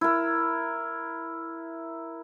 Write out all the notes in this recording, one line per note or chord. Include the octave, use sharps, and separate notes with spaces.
E4 A#4